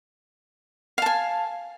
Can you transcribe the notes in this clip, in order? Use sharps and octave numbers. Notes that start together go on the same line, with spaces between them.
F5 G#5 A5